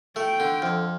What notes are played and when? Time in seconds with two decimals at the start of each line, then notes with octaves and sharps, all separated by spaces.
0.16 A3 G5
0.40 D3
0.62 F2